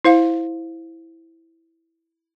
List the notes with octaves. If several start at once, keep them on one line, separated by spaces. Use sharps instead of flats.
E4 C5 F5